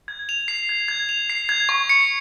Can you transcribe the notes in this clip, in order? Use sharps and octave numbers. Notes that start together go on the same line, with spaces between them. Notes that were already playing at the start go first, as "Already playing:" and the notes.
G#6
F7
C7
G#6
G#6
F7
C7
G#6
C#6
C#7